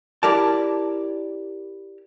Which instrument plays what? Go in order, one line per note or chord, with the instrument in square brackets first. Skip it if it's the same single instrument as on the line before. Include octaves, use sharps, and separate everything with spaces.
[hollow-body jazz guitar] E4 G4 A#4 D5 A5